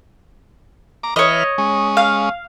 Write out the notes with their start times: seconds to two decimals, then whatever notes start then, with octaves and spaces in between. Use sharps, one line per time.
1.03 A#5 D6
1.16 E3 B4 C#5 D#5 F6
1.58 G#3 C#4
1.97 F5